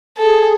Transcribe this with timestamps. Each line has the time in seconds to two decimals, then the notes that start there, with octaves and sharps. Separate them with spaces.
0.18 G#4 A4